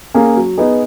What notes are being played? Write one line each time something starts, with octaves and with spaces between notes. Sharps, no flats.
A#3 C#4 G#4
F#3
B3 D#4 G#4